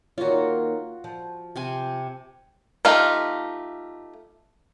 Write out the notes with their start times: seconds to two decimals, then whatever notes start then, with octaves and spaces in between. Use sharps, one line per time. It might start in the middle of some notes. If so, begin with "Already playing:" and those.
0.18 D#3 A#3 F4 F#4 C#5
1.04 F3
1.56 C3 C4 G#5
2.85 A3 D#4 F4 G4 F5